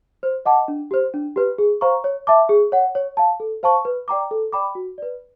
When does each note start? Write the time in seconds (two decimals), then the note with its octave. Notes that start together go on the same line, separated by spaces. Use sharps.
0.23 C5
0.46 D#5 F#5 A5 D6
0.68 D4
0.91 G4 C5
1.14 D4
1.36 G4 B4
1.58 G#4
1.81 C5 F5 A#5 C#6
2.04 C#5
2.27 E5 A5 D6
2.49 G#4
2.72 C#5 F#5
2.95 C#5
3.17 F5 A5
3.40 A4
3.63 C5 F5 A5 C#6
3.85 B4
4.08 D5 G5 A#5 D6
4.31 A4
4.53 D5 G5 B5 D6
4.75 F#4
4.98 B4 D5